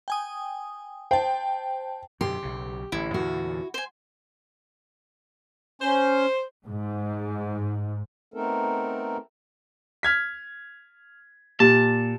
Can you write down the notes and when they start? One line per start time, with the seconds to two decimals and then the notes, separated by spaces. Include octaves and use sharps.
0.08 G5 G#5 D#6
1.11 C5 G5 A5
2.21 F#2 B2 D3 G4 C6
2.42 B1 C#3
2.92 A1 D3 E4
3.14 E2 A#2 D3 F#4
3.74 C5 G#5
5.82 C#4 C5
6.66 G#2
8.34 A3 B3 C4 D#4 A4 A#4
10.03 F6 G#6 B6
11.60 A#2 G4 A5